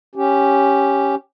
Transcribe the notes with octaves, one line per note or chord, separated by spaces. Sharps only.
C#4 G4